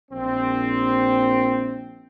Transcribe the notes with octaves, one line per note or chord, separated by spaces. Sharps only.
A#1 C4